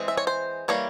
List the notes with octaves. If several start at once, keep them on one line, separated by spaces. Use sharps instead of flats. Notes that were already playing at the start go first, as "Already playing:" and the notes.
Already playing: E3 G#3 C4
E5
C#5
C5
E3 G3 A#3 C#5